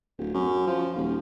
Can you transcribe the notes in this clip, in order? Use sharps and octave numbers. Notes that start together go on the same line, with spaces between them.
D1
F#2
F3
D#1